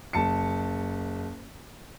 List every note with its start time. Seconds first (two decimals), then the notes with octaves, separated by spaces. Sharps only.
0.13 F#1 A5 C#7